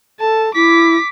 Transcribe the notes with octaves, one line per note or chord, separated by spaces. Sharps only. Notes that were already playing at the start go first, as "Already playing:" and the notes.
A4 A5
E4 D6 B6